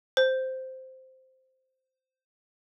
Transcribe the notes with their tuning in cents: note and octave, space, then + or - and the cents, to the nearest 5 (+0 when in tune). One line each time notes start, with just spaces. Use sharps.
C5 -5